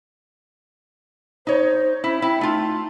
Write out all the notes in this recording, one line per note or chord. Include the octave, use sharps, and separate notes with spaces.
D#4 C5 C#5
C#4 E4
E4 G5
A3 D#4 F4